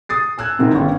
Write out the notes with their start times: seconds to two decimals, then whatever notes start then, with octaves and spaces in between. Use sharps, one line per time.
0.09 D#6 A6 C7
0.38 G#5 E6 F#6 G#6
0.59 G#2 C3 D#3 E3
0.74 G1 C4 C#4